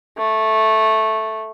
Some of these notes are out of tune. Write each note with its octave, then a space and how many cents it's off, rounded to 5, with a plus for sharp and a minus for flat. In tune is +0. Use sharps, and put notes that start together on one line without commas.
A3 -5